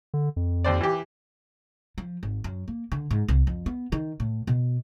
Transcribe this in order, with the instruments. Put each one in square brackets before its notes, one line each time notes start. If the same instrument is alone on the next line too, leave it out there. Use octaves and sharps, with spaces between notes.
[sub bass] D3
F2
[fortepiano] D#2 C5 D5
E3 G4
[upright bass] F3
G#1
F#2
A#3
D3
G#2
C2
F2
B3
D#3
A2
B2